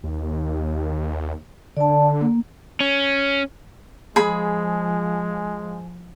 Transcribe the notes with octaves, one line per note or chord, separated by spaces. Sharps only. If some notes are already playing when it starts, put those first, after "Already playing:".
D#2
D3 D5 A5
A#3
C#4
F3 G#3 G#4 B5